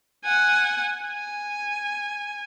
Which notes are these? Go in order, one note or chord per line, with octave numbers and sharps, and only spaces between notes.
F#5 G#5
G#5